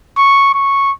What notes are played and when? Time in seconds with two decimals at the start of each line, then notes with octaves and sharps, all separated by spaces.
0.17 C#6
0.54 C#6